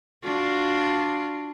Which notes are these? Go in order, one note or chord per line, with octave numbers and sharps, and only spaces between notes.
D4 F4 F#4